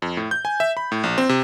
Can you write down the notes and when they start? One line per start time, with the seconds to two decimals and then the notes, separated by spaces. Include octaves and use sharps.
0.02 F2
0.17 A2
0.31 G6
0.45 G#5
0.60 E5
0.77 B5
0.92 A2
1.04 A#1
1.18 C4
1.29 C3